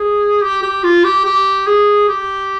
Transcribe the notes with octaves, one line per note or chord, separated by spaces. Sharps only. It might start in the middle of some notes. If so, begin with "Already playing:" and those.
Already playing: G#4
G4
G4
F4
G4
G4
G#4
G4